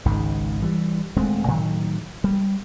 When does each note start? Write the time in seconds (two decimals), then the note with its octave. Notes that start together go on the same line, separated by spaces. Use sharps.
0.05 G#1 C#2 G#2 D#3
0.62 E3 G3
1.16 D#1 G#3 A3 C4
1.48 A2 D#3 F#3
2.24 G3